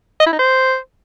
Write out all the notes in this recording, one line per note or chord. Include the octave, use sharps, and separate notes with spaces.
D#5
E4
D#4
C5